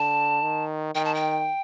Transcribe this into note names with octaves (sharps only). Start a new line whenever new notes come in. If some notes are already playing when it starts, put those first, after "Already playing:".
Already playing: D3 A5
D#3
D#3 G5
A5
G5